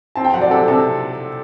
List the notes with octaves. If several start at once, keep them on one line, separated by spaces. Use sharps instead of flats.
C4 A5
G5
F#3 F#5
D5
C3 A4
C3 A4